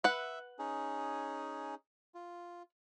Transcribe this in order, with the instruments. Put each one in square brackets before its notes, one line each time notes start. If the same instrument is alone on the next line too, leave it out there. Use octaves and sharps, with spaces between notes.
[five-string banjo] B4 F#5 [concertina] E5
[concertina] C#4 D#4 G#4
F4